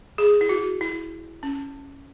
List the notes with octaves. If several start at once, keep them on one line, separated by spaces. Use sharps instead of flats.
G#4
E4
F#4
E4
C#4